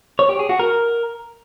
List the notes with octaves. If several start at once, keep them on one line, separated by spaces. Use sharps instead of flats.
C#5
G4
G#4
F#4
A#4